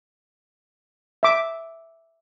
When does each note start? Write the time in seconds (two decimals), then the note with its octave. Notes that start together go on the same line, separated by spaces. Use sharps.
1.23 E5 D6